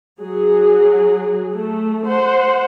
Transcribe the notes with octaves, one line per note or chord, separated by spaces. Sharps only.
F#3 G#4
A3
C5 F#5